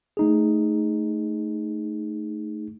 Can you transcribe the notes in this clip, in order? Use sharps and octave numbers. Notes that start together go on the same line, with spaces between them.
A3 D#4 G#4